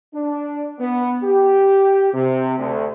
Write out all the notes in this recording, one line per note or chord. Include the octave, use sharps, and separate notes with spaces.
D4
B3
G4
C3
D2